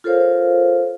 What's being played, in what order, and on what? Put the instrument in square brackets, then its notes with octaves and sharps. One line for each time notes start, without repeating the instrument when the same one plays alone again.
[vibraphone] F4 A4 A#4 C5 C#5 F5